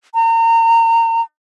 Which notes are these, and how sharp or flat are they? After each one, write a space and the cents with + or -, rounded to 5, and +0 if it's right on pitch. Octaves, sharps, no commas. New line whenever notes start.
A#5 -30